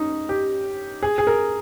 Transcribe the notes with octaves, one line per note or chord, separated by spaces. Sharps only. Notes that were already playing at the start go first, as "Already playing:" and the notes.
Already playing: C#4 D#4
G4
G#4
G#4
A#4